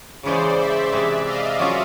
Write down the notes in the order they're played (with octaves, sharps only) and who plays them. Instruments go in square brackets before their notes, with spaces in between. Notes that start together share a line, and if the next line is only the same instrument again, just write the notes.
[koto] C#3 E3 G#3 C#4 [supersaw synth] C5 D5
[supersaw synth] D5 E5
[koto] C3 E3 G#3
[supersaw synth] D#5 F5
[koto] F#3 A#3 C#4 F4